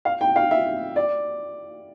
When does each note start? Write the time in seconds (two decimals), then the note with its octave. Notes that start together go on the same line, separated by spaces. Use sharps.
0.05 F5
0.21 G5
0.36 F5
0.51 E5
0.96 D5